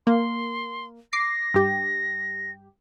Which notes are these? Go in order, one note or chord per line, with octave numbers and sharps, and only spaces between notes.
A#3 C6
D6 A#6 C7
G2 G4